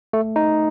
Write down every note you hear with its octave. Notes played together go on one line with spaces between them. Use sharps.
A3
D#4